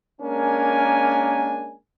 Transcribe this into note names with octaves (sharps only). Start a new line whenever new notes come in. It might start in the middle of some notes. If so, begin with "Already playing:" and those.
G#3 A#3 C#4 D4 A#4 G#5